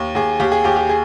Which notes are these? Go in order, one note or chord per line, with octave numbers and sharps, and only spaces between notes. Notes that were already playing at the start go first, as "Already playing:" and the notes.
Already playing: D#2
D#2 G#4
D#2 G4
G#4
D#2 G4
G4
G#4